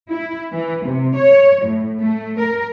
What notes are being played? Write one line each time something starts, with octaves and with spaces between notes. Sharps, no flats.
E4
E3
C3
C#5
A2
A3
A#4